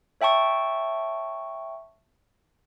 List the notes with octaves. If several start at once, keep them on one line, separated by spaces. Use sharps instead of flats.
C#5 E5 G5 A5 C#6